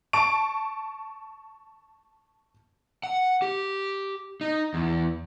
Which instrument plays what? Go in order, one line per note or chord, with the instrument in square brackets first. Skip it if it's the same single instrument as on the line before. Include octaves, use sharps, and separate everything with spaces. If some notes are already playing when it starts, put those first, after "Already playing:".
[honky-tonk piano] A5 C#6 D7
[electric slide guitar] F#5
G4
D#4
E2